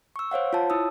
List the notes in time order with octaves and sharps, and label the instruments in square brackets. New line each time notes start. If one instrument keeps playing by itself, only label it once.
[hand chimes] C#6 E6
C5 C#5 F5 F#5
F4 C#5 A5
E4 D#6 E6